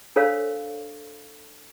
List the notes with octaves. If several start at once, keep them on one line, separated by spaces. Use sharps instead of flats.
D4 A4 A#4 C5 C#5 F5